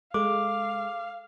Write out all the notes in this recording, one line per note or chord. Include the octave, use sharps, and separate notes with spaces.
G#3 A4 F5 D6